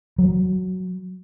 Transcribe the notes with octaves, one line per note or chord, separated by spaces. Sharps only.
F#3